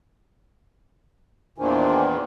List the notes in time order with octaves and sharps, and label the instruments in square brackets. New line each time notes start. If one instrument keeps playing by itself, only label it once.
[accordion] E2 A#2 D#3 [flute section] D4 C5 G#5